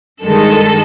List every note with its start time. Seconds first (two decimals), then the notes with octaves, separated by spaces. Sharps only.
0.23 G2 D#3 G#3 A4